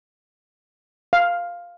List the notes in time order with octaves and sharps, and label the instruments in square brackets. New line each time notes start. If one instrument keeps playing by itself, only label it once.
[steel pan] F5